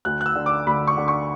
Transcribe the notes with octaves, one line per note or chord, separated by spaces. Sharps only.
D2 F#6
F#6
E6
D3
D6
D2 B5
C#6
D3
C#6